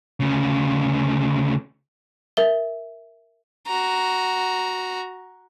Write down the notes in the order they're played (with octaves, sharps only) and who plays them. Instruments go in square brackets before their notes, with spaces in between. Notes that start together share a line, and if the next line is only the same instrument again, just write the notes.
[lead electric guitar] D2 C#3
[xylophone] A#4 E5 G7
[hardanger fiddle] F#4 A#5